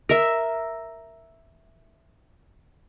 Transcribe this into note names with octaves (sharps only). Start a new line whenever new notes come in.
A#4 E5